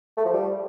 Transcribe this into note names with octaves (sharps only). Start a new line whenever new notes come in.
A3
F3
G3